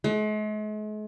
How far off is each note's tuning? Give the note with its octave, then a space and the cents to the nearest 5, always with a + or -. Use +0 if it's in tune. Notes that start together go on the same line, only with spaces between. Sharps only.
G#3 +45